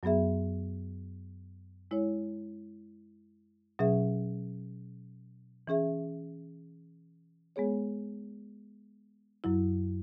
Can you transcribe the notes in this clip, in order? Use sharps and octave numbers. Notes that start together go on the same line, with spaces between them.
F#2 F#3 B3 G#4 E5
G#3 E4 C#5
B2 F#3 C#4 G#4 E5
E3 C#4 G#4 E5
G#3 B3 G#4 C#5
F#2 F#3 E4